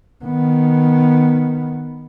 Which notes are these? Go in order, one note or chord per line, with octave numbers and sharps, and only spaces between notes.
D#3 B3